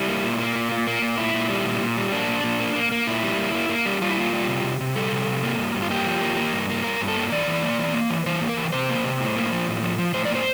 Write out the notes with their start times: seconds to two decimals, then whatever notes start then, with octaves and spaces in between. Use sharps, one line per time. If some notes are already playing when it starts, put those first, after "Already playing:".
Already playing: G3 E4
0.08 A#3
0.23 A#2
0.39 A#3
0.56 A#2
0.72 A#2
0.87 A#3
1.02 A#2
1.18 A#2 E4
1.34 A#2
1.49 G3
1.65 A#2
1.80 A#2
1.97 G3
2.12 A#3 D4
2.28 A#2
2.44 A#2
2.60 A#3
2.75 A#3
2.92 A#3
3.07 A#2 E4
3.23 G3
3.38 A#3
3.55 A#3
3.69 A#3
3.86 G3
4.02 G3 F4
4.10 E4
4.17 A#3 F4
4.33 G3
4.48 C3
4.64 C3
4.81 C3
4.96 G3 A4
5.12 C3
5.28 C3
5.43 A#3
5.58 G2
5.74 G2
5.82 F4
5.90 A#3 G4
6.06 F3
6.21 A#3
6.37 A#3
6.53 G2
6.69 A#3
6.84 G2 A#4
7.01 G2
7.08 A4
7.16 A#3
7.32 E3 D5
7.47 E3
7.62 A#3
7.78 E3
7.94 A#3
8.10 E3
8.26 E3 C5
8.42 A#3
8.49 A#4
8.57 E3
8.73 C3 C5
8.90 A#3
9.04 C3
9.21 A2
9.36 A#3
9.52 F3
9.68 A2
9.83 F3
9.98 F3
10.14 A2 C5
10.25 D5
10.31 A#3 C5